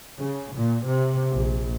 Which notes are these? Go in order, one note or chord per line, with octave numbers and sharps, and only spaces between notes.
C#3
A#2
C3
A#1